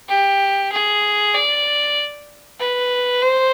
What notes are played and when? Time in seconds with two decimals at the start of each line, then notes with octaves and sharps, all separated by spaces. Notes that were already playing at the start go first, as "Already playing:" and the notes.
0.08 G4
0.72 G#4
1.34 D5
2.59 B4
3.22 C5